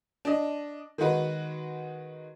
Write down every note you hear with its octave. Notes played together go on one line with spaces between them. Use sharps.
D4 D#5
D#3 G#3 D#4 F#4 B4